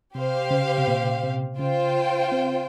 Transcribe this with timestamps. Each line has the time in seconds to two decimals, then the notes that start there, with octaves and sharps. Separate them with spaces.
0.15 C3 G4 C5 F5
0.51 C#3
0.78 C3
0.88 A#2
1.24 C3
1.59 C#3 F4 C5 G5
2.32 C4